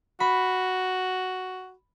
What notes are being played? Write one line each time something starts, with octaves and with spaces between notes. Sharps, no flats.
F#4 B5